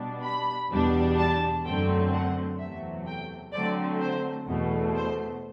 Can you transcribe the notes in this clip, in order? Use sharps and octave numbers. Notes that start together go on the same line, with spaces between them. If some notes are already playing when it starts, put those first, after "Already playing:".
Already playing: B2 G3 D4
B5
E2 B2 G3 D4
A5
F#2 D3 F#3 A3 C4 G5
F#5
E2 C3 F#3 A3 E5
G5
D3 F#3 A3 C4 D5
C5
E2 B2 A3
C5